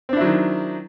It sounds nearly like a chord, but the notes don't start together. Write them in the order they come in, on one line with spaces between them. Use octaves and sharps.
C4 D4 E4 F#3 D#3